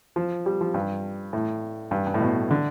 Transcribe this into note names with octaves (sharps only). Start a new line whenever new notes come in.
F3
G3
F3
G2
A2
G2
G2
A2
B2
D3